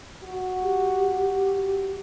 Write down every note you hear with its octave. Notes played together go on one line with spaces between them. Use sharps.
F#4
G4